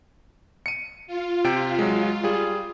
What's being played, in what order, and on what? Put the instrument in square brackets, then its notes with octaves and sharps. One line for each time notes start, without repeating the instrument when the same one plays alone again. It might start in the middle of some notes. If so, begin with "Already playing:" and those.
[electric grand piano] C#7 D#7
[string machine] F4
[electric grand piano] C3 G5 D7
F#3 G#3
G3 G#4